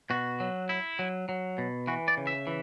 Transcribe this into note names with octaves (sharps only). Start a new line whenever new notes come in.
B2 F#4
F#3
E4
F#3
F#3
B2
E3 F#4
D5
C#3
E5
E3